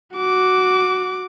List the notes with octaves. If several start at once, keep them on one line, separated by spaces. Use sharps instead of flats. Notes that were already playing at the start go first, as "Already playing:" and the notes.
F#4 D6